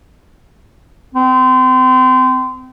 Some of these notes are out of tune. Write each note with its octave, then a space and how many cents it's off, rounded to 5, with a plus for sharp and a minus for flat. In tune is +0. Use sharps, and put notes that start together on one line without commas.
C4 -30